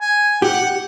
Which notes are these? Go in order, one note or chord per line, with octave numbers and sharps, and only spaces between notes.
G#5
G4 F#5